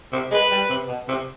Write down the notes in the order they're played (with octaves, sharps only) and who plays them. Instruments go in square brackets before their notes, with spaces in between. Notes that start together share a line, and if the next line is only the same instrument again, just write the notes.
[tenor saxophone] C3
[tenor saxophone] G#3 [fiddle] B4
[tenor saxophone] G3
C3
B2
C3